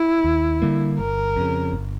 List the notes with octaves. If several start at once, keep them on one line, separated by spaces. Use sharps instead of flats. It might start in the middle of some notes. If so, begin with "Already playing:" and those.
Already playing: E4
D#2
D3 G3 A#3
G1 A#4
F2 C#3
G1